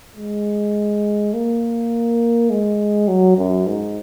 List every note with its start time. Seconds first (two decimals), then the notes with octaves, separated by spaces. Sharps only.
0.17 G#3
1.33 A#3
2.50 G#3
3.08 F#3
3.37 F#2
3.67 G#2